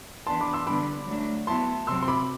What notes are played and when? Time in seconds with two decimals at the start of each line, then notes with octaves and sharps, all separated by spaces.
0.27 E3 B3 D4 A5 C6
0.40 B5 D6
0.53 C6 E6
0.67 D3 G3 B3 D4 B5 D6
1.07 F#3 A3 D4
1.47 F#3 B3 E4 A5 C6
1.87 C3 F#3 C4 C6 E6
2.02 C6
2.08 B5 D6